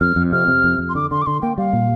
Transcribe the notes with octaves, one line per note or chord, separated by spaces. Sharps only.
F2 F6
F2
C3 F6
C3
F2
F2
C6
D3 D6
D3 C6
D6
D3 C6
A#3 G5
G3 F5
A#2